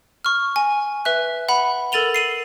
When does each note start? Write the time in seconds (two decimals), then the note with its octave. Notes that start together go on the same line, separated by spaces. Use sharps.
0.25 C#6 F6
0.56 G#5
1.05 B4 E5 F#6
1.49 F#5 B5
1.92 A4 A#4 A6 D#7 F7 G7
2.14 C7 D#7 F#7